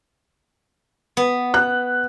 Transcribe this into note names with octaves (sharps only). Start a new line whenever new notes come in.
B3
F#6